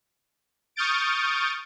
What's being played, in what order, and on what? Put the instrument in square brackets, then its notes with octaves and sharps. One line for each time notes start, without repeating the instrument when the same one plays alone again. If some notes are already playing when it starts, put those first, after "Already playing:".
[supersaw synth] C#6 D#6 F6 G6 A6 D7